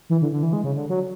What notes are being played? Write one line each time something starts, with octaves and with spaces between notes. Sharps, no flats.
E3
D3
D3
E3
G#3
C#3
D3
F#3